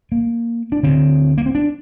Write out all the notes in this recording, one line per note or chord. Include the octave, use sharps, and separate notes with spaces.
A#3
D4
D2 D3 C4
A#3
C4
D4